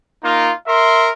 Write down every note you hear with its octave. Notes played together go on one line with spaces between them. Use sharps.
A#3 D#4 F4
A#4 E5 C6